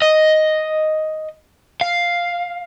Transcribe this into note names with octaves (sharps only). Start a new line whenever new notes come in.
D#5
F5